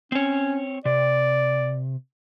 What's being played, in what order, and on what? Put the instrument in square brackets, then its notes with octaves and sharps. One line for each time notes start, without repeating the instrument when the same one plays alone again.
[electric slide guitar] C4 C#5 [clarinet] C#4
[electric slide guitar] C3 [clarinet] D5